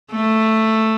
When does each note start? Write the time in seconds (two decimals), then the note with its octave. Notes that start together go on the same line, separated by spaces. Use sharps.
0.12 A3